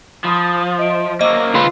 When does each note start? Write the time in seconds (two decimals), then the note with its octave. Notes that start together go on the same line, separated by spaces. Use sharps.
0.25 F3 B5 D#6
0.79 D#5 E5 D7
1.21 F#3 A#3 C5 D#5 D6 E6
1.55 F4 B4